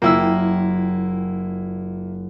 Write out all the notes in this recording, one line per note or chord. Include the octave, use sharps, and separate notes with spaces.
F#1 A#3 E4 F4 G5 E6